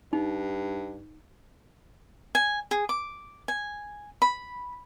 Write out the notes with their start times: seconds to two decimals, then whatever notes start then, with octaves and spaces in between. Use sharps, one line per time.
0.13 G2 D#4
2.35 G#5
2.71 G#4
2.89 D6
3.48 G#5
4.22 B5